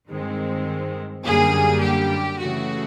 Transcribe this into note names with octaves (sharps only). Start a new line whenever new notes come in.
G2 D#3 G#3 C4
F#2 D3 G3 A#3 G#4
G4
C#3 E3 A3 F#4